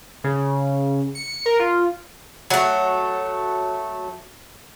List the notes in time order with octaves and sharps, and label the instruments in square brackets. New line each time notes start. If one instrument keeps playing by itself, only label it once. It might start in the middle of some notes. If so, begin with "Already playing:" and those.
[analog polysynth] C#3
C#7
A#4
F4
[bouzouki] F#3 A3